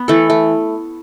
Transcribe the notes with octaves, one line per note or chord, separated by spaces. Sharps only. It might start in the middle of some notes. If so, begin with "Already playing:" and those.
Already playing: B3
E3 A3 A4
A3